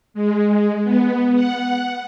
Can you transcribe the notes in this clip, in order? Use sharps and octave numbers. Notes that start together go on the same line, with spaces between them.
G#3
B3
F#5